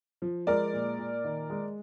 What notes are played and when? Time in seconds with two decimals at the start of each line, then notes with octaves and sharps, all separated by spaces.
0.22 F3
0.47 G#3 A#4 D5
0.73 A#2
0.99 A#2
1.24 D#3
1.50 G#3